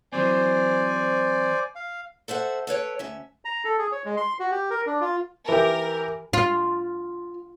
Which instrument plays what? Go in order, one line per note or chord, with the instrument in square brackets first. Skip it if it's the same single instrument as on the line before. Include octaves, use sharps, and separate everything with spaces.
[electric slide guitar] E3 F#3 C4 [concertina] C5 D5 G#5
[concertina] F5
[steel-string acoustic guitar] A4 C5 E5 F#5
A4 B4 C#5 G5
D2 C#4 E5
[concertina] A#5
A4
G#4
C#5
G#3
C6
F#4
G4
A#4
D4
F4
[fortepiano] E3 G4 [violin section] A#4
[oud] F4